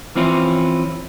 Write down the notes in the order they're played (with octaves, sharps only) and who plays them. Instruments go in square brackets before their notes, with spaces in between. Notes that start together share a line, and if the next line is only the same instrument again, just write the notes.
[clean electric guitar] E3 F3 C4 C#4 E4 F4